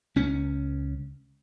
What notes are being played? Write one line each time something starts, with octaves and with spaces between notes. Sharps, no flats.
C#2 C#4